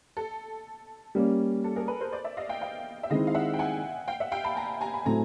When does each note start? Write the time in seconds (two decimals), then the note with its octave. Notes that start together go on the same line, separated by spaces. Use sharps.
0.17 A4
1.15 G3 A#3 C#4
1.64 A4
1.76 G#4 A#4
1.88 A4 B4
2.01 A#4 C5
2.12 C5 D5
2.24 D5 E5
2.37 D#5 F5
2.49 F5 G5
2.61 F5 G5
3.03 E5
3.10 D#3 G#3 C4 E4 D#5 F5
3.27 F5
3.35 E5 F#5
3.53 G5
3.59 F#5 G#5
4.08 F5 G5
4.20 E5 F#5
4.32 F5 G5
4.44 A5 B5
4.56 G#5 A#5
4.81 G#5 A#5
4.94 B5
5.05 A2 F#3 A3 C4 G#5 A#5